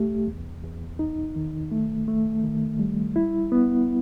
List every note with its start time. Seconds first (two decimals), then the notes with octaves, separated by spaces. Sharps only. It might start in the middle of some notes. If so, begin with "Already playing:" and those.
Already playing: C2 A3 G4
0.27 E2
0.64 E2
0.99 D#4
1.36 D#3
1.72 A3
2.08 A3
2.43 D#3
2.79 G3
3.16 E4
3.52 B3